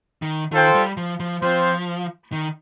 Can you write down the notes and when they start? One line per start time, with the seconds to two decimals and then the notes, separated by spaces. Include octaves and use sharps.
0.22 D#3
0.52 D#3 F4 A4 C5 G5
0.75 G3
0.97 F3
1.20 F3
1.42 F3 C4 F4 C5
2.32 D#3